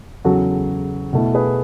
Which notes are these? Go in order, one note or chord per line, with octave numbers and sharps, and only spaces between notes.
E2 C#3 F#3 F#4 A4
B2 A3 E4
G#4 B4